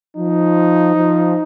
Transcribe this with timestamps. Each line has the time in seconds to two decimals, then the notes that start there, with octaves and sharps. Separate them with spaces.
0.17 F3 D#4
0.95 F3